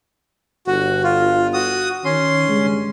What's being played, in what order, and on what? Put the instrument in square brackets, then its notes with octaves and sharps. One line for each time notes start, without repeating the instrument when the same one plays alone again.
[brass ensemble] G1 [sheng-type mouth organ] F#4
[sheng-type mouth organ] F4
F#4 D#6
[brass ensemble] D#3 [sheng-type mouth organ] C#4 C6
[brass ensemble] G2 C#3 G#3